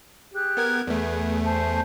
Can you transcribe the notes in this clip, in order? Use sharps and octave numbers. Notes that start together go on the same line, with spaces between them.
G4 G#4 F#6
B3 A#4 G#6
E2 A3 G#4 B4
C5 G#5 A5